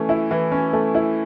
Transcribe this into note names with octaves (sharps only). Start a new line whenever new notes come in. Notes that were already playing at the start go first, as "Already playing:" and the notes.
Already playing: E3 A3 C#4
E4
E3
C#4
A3
E4